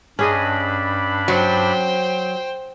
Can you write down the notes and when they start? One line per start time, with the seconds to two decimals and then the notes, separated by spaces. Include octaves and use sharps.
0.19 G2 C#4 D4 G#4 D#5 B5
1.28 F#3 C5 G5